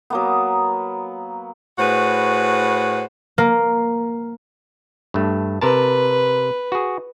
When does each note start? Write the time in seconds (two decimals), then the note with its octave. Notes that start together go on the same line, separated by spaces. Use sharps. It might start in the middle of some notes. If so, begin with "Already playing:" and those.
0.10 F#3 A#3 B3
1.78 A2 F#4 G#4 B4 C5
3.38 A#3
5.14 G2 A3
5.61 C3 A#4 B4 A5
6.72 F#4 G#4